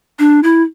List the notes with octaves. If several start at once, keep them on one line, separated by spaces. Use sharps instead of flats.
D4
E4